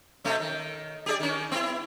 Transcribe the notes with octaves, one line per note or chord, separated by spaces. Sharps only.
B2 A3 C#4
D#3
G4 G#4 D5
D#3 C#4
B3 E4